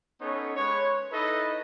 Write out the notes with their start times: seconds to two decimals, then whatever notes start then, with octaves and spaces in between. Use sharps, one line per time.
0.21 B3 C#4 D#4 A4 C#5
0.57 G#3 B4 C#5
1.11 D#4 E4 A4 B4 D#5